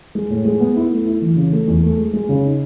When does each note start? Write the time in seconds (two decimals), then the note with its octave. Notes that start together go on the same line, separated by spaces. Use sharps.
0.15 G#3
0.30 A2
0.45 G#3
0.60 B3
0.76 E4
0.91 A3
1.06 E4
1.22 E3
1.36 C#3
1.52 A3
1.68 E2
1.83 A3
1.98 G#3
2.13 G#3
2.29 C#3
2.45 D#4